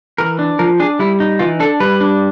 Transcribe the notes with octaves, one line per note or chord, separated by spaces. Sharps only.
E3 A#4
D4
F3 A#4
D4 G#4
G3 E4
D#4
E3 F4
D4 A4
G3 B4
D4